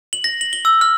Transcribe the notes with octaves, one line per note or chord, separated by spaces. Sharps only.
F#7
A#6
F#7
G7
E6
F6